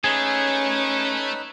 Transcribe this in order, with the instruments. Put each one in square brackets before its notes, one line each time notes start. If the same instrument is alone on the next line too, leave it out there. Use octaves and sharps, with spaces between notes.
[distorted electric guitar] A3 [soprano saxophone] C#4 [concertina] D#4 B4 [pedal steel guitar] G#4